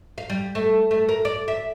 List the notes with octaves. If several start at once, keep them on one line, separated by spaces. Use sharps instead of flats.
F5
G3
A3
A3
A#4
D5
E5